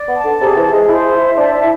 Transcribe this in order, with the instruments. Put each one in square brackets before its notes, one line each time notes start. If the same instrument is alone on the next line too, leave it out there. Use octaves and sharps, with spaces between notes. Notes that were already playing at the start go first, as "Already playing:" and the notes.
Already playing: [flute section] D5
[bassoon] B3
[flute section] A5
[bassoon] D3
[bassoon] C3 [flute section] G#4
[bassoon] E3
[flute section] G#4
[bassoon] G#3
[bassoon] E4 [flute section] C5
[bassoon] E4 [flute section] E5
[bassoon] D4 [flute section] A5
[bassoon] D4
[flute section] E4